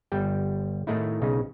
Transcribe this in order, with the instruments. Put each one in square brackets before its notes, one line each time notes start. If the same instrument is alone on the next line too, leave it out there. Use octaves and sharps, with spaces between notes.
[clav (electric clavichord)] G1 G3 G5
A2 D#3 A3 D#4 E4
B1 C#3 D#4